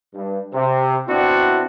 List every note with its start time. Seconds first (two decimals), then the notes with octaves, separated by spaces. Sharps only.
0.14 G2
0.52 C3
1.08 B2 C4 D4 E4 F#4